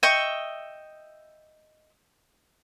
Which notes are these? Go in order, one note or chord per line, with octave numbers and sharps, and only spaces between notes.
D#5 E5 G5 C#6